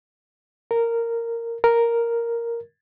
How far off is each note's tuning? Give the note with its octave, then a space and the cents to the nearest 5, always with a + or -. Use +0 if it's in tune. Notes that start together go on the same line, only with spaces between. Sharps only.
A#4 -10
A#4 +0